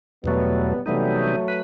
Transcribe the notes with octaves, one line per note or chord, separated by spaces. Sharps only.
E2 B2 F#3 G3 A3 B3
C3 E3 F#3 G3 A3 B3 D#4
B4